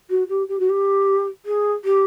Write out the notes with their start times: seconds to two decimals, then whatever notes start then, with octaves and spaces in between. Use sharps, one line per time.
0.10 F#4
0.29 G4
0.48 G4
0.59 F#4
0.69 G4
1.45 G#4
1.84 G4